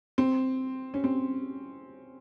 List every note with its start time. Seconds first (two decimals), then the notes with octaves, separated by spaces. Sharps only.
0.18 C4
0.94 C#4
1.04 C4